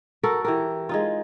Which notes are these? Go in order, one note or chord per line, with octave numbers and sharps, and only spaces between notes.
F#4 A4 A#4
E3 G4 A#4
G#3 D#4 F4